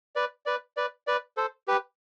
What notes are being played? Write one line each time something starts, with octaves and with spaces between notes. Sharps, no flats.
B4 D5
B4 D5
B4 D5
B4 D5
A4 C5
G4 B4